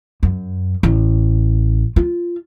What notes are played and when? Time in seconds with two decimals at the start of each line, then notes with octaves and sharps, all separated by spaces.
0.23 F#2
0.83 A1
1.96 F4